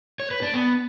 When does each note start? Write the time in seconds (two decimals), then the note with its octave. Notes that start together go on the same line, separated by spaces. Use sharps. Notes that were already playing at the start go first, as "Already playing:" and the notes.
0.20 C#5
0.31 B4
0.42 D4
0.54 B3